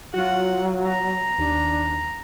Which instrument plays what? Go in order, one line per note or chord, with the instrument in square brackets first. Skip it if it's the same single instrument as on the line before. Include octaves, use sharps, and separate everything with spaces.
[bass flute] F#3 [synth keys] F4 F#4 [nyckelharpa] F#5
[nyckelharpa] A#5
[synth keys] D#2 [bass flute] D4